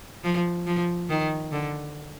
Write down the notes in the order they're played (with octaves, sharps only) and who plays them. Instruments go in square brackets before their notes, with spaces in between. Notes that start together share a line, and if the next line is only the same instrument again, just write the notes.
[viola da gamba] F3
F3
D#3
D3